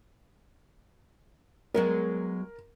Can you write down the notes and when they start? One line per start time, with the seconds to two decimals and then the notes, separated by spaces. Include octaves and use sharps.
1.74 F#3 G#3 B3 A#4